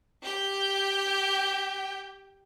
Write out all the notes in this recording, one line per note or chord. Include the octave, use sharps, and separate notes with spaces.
G4 G5